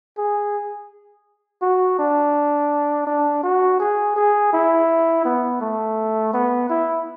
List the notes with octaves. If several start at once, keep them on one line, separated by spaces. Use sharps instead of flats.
G#4
F#4
D4
D4
F#4
G#4
G#4
E4
B3
A3
B3
E4